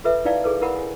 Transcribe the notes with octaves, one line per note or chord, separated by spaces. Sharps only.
F4 A4 B4 E5
D#4 E4 D5 F5 G5
G#4 A4 B4
E4 A#4 F#5 B5
G#5